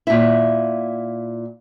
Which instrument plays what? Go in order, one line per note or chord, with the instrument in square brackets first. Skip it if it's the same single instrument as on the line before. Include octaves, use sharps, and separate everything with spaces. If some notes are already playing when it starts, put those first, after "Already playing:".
[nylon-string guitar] A#2 E4